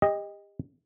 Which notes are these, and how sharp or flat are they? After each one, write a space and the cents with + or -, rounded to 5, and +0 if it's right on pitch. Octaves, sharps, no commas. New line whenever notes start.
G4 +35 D#5 +0